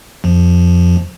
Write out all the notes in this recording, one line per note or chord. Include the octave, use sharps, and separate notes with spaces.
F2 F3